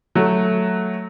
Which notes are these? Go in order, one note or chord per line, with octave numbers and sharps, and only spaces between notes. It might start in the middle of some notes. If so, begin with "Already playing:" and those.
F#3 A3